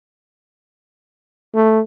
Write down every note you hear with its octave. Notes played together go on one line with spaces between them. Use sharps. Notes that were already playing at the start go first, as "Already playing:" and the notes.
A3